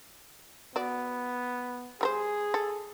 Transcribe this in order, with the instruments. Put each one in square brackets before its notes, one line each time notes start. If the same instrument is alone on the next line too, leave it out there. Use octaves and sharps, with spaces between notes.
[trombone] B3 [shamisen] F#4 D5
[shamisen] G3 A#4 C5 [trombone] G#4
[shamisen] A4